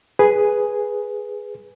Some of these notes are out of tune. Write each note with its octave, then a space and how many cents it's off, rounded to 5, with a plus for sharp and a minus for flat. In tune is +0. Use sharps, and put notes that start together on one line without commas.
G#4 +0 B4 -5